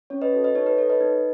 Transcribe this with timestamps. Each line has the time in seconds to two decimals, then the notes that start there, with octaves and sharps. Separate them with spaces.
0.10 C#4 C#5
0.22 B4 D#5
0.33 F#4 A4
0.44 B4 D#5
0.55 D#4 C#5
0.66 B4
0.78 A4 C#5
0.90 B4 D#5
1.00 D#4